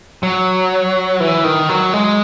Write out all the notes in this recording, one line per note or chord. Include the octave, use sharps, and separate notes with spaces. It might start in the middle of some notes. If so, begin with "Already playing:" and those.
F#3
E3
D#3
F#3
G#3